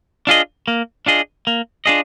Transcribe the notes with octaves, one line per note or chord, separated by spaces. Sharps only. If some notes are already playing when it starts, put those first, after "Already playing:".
D4 F4 G#4 D#5
A#3
D4 F4 G#4 D#5
A#3
D4 F4 G#4 D#5